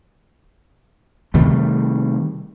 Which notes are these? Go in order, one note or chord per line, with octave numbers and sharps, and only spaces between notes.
C3 D#3 G3 A3